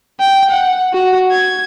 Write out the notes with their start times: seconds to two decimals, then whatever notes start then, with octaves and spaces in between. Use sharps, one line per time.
0.20 G5
0.51 F#5
0.93 F#4
1.32 G#6